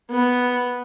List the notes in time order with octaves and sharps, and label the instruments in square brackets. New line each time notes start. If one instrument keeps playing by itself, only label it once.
[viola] B3